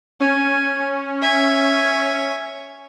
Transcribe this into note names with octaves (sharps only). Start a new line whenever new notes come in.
C#4 G#5
C#5 E5 G#5